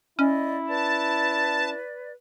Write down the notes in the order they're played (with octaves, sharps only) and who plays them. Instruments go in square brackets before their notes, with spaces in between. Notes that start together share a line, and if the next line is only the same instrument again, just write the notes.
[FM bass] C#4 [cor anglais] E4 [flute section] D5 D#5
[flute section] B4 D5 [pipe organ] A5